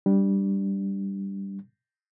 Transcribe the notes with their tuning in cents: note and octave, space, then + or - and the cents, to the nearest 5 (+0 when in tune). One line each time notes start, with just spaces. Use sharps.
G3 +0 D4 +0